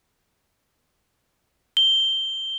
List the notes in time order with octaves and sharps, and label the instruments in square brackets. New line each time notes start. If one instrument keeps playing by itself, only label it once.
[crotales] G7